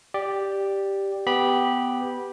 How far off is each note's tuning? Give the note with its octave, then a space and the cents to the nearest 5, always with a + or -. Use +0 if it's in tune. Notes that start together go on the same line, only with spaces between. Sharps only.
G4 +0 D5 +0
B3 +15 G4 +5 B5 -15